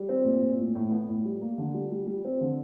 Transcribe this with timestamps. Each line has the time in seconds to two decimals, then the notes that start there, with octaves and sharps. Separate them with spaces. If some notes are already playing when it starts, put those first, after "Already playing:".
Already playing: G3
0.09 C4
0.25 A#2
0.41 A#2
0.58 A2
0.75 A2
0.91 B3
1.08 A2
1.25 G3
1.41 A#3
1.58 D3
1.74 G3
1.92 G3
2.07 G3
2.25 C4
2.41 D3